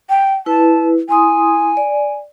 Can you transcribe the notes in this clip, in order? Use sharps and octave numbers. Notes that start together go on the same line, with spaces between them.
G5
E4 B4 A5
E4 G#5 C6 D#6
D5